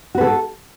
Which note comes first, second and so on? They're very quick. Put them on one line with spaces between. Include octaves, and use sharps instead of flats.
F#4 B4 A4